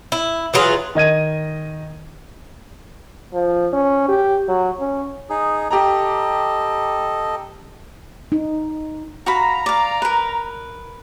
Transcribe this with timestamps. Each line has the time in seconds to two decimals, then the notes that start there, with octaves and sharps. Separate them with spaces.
0.12 E4
0.54 E3 F#3 F4 G#4
0.95 D#3 D#5 G#6 D#7
3.33 F3
3.73 C#4
4.09 G4
4.48 F#3
4.79 C#4
5.30 D#4 G#4
5.71 G4 A4 D#5 A#5
8.32 D#4
9.26 F#4 F5 A#5 B5
9.66 D5 F5
10.02 A#4 B4